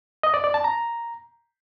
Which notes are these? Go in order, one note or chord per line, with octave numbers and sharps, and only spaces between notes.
D#5
D5
D5
A5
A#5